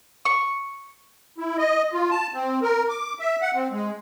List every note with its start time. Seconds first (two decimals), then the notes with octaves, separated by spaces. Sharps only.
0.25 C#6
1.38 E4
1.58 D#5
1.93 F4
2.10 A5
2.34 C4
2.62 A#4
2.89 D6
3.19 E5
3.41 F#5
3.55 C4
3.72 G#3